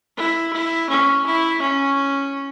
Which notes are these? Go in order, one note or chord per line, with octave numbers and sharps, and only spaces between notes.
E4
E4
C#4
E4
C#4